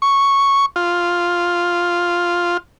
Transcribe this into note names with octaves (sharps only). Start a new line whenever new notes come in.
C#6
F4